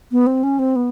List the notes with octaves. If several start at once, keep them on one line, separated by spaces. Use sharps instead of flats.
B3
C4
C#4
C4
B3